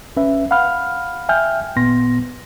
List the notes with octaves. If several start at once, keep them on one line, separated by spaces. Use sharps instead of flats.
G#1 C#4 B4 E5
F5 F#5 B5 F6
E5 G5 G#5 F6 G6
G#1 A#2 B3 C6 A#6